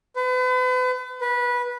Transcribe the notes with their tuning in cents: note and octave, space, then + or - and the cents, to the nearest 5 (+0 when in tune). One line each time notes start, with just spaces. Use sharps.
B4 +40
B4 -20